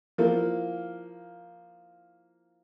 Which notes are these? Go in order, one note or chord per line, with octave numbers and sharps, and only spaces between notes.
F3 A#3 E4